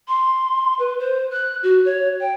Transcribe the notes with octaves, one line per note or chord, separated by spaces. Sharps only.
C6
B4
C5
F#6
F#4
C#5
G5